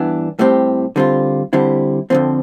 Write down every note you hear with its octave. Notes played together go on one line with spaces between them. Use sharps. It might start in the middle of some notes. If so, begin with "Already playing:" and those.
Already playing: G2 E3 B3 D4
A2 G3 C4 G4
D3 G3 C4 F4
D3 G3 C4 E4
F2 D3 F3 C4